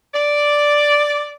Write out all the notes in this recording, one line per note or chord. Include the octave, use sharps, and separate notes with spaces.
D5